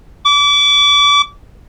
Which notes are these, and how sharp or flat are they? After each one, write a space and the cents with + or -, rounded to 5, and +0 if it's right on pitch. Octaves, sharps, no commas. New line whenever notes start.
D6 -30